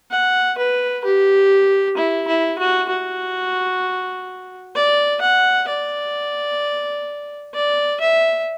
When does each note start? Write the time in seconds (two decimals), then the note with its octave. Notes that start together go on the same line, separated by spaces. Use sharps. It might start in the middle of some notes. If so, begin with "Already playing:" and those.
0.11 F#5
0.58 B4
1.04 G4
1.97 E4
2.28 E4
2.59 F#4
2.90 F#4
4.75 D5
5.21 F#5
5.68 D5
7.54 D5
8.00 E5